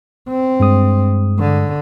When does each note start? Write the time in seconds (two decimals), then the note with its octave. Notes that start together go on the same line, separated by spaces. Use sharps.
0.29 C4
0.60 G2 G#3 D#6
1.39 D3